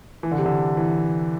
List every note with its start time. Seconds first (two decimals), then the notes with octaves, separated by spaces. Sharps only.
0.23 E3
0.31 D3
0.38 C3
0.46 D3
0.77 E3